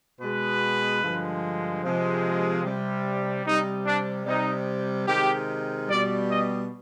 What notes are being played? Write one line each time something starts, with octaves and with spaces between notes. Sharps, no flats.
B2 G#3 B4
G2 D3 F3 G#3
C3 F3 G#3
C3 G3
C3 G3 D#4
D4
C3 G3 D#4
C3 D#3 G#3 G4
B2 G3 D5
D#5